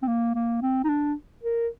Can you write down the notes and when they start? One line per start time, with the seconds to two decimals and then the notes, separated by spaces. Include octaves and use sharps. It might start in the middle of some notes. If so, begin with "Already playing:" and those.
0.02 C4
0.08 A#3
0.35 A#3
0.62 C4
0.84 D#4
0.89 D4
1.43 A#4